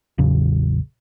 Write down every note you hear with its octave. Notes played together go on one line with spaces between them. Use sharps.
A1 E2 C#3 F#3